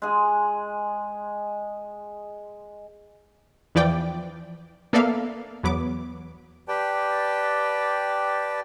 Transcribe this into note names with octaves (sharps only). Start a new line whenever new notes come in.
G#3 G#4
E2 E3 F3 D5 G5 D6
A#3 B3 A4 D5 E5 F5
E2 F#3 B3 D6
G4 B4 D5 G5 A5